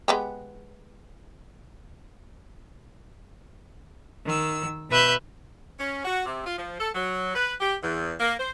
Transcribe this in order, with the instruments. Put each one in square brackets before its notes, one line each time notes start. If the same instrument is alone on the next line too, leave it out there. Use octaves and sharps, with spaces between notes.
[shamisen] G#3 B3 G4
[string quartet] D#3 E6
B2 B4 E5 F#6 G6
[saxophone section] C#4
F#4
C3
F4
F3
A4
F#3
B4
G4
E2
A#3
C5